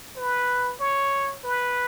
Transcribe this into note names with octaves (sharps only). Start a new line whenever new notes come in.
B4
C#5
B4